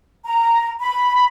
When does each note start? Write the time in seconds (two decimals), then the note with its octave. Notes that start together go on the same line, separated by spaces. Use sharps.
0.24 A#5
0.81 B5